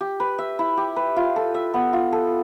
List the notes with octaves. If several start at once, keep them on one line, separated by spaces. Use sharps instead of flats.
G4
B4
E5
E4
G4
B4
F4
A4
E5
B3
F4
A4